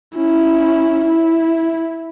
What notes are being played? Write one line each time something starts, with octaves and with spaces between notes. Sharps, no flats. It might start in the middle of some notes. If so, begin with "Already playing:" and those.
C#4 E4
E4